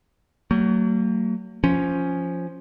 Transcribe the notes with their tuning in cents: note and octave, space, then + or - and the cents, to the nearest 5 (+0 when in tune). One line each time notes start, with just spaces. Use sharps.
F#3 +30 A#3 -45
F3 +0 C#4 +0